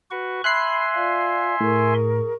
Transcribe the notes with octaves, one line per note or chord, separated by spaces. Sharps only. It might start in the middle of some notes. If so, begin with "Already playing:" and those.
F#4 B4 C#6
E5 G#5 B5 C6 F#6 C7
F4 D5 F5
A2 G#4 A#4 C#6